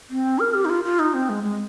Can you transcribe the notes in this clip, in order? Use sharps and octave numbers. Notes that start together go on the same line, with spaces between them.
C4
A#4
G4
D#4
F4
F4
D#4
C4
G#3
G#3